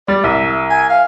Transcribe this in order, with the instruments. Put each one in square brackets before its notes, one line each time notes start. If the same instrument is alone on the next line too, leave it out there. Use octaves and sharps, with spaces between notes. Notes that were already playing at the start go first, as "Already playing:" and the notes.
[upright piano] G3 [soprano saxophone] D5
[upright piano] C2 [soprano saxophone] E5
[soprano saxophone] G#5
F5